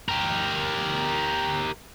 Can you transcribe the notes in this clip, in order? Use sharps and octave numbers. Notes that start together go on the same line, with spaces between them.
G4 A#4